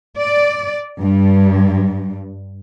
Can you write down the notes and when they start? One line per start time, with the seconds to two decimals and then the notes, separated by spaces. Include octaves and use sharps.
0.16 D5
0.99 G2